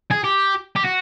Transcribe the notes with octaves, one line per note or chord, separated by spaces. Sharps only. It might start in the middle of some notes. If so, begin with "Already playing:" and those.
G#4
G4
G4
F#4